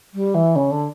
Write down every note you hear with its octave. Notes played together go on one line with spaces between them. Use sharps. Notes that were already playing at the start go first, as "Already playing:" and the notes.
G3
E3
C#3
D3